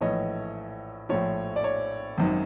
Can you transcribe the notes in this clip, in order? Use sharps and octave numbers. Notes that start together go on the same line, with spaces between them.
A#1 A2 E3 C#5 D#5
A#1 A2 F3 C#5
D5
C#5
G#1 F#2 D#3